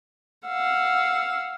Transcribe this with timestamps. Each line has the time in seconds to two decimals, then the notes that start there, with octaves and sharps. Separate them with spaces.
0.48 F5 F#5 E6